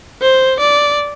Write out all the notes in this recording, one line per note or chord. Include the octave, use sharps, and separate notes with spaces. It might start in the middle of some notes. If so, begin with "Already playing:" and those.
C5
D5